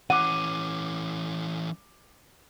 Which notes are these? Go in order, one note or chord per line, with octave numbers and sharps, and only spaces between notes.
E3 C#4 F#5 D6 D#7